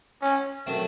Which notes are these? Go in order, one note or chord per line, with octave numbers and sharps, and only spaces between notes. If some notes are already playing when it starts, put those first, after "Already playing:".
C#4
D#3 F#3 A3 C4